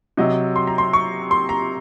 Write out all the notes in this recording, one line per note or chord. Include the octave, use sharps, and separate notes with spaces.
C3 F#3 D#5
C6
A#5
C6
C#6
C6
A#5